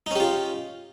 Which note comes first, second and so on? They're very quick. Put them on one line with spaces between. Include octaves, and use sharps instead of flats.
D#4 C#4 G4 F4